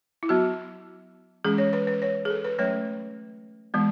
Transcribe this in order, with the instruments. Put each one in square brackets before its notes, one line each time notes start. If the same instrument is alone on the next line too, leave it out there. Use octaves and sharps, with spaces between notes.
[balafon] E4
F#3 B3 F#4
E3 G#3 C#4 G#4
C#5
B4
B4
C#5
G#4
A4
B4
F#3 A3 C#4 C#5
E3 G#3 B3